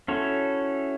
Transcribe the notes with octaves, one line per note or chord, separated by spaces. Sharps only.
C#4 E4 F#4 A4 C#5